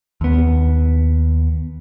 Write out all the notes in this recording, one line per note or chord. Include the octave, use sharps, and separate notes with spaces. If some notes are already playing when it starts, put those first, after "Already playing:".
D#2 B3